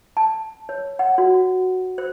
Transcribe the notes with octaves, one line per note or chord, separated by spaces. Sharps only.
A5
C#5
F#5
F#4
C5